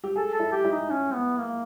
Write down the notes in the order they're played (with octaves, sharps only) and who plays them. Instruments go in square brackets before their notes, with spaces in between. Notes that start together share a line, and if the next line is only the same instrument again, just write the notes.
[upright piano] G4
[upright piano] G#4 [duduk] A4
[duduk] A4
[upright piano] E4
[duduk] G4
[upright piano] E4
[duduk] D#4
C#4
B3
A#3